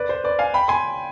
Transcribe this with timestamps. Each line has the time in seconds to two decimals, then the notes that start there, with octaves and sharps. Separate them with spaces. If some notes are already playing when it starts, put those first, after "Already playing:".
Already playing: B4 D5
0.09 C5
0.24 B4 D5
0.39 F5 G#5
0.54 G5 B5
0.68 G#5 C6